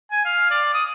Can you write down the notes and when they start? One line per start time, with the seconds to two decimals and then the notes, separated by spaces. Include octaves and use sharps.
0.11 G#5
0.26 F5
0.51 D5
0.74 D#6